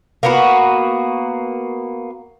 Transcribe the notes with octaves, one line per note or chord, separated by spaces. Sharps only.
A#3 B3 F#4